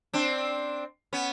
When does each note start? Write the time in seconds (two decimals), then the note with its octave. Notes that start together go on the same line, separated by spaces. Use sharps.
0.14 C4 D4
1.13 B3 C#4